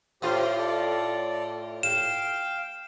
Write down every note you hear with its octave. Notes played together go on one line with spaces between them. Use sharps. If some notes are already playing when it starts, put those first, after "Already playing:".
A2 F4 G4 C5
A4 D5
F5 G5 E7